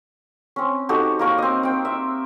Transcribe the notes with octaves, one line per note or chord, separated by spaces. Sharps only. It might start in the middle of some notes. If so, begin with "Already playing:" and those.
C4 C#4
D#4 F#4 G4 A4
A#3 A#4 C#6
C4 D#5
C4 G5
E5